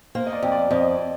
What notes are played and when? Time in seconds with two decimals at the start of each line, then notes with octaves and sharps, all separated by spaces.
0.15 A#3 C5
0.27 D#5
0.33 D5
0.42 F2
0.52 D5
0.71 F2 D#5